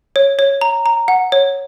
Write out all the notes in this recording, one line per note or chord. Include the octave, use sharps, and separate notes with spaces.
C#5
C#5
A#5
A#5
F#5
C#5